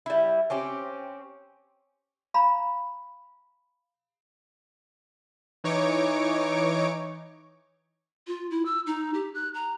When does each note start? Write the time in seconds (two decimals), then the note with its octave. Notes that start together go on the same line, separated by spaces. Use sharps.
0.06 G3 E4
0.50 C4 C#4 G4
2.34 F5 A#5 B5
5.64 E3 D#4 C#5 C#6 D6 D7
8.27 F4
8.51 E4
8.66 E6
8.87 D#4
9.14 G4
9.34 F#6
9.54 A#5